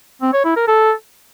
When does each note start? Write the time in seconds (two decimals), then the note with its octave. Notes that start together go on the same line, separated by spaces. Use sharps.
0.22 C4
0.33 C#5
0.45 E4
0.56 A#4
0.68 A4